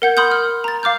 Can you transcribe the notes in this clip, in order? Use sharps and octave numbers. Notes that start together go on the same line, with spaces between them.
A#4 F#5 G6 G#6
B5 C6 D#6 F6 G6
F6
A#5 A6
F5 D6 F6 G6